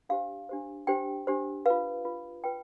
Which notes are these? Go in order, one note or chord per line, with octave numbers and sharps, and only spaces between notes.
D4 G4 C5 F5
D4 G4 C5
D4 G4 C5 G5
D4 G4 C5
F4 B4 F5
F4 B4
F4 B4 G5